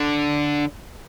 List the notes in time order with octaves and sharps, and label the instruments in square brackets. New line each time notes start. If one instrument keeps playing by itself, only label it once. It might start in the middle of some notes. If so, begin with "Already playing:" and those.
Already playing: [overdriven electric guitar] D3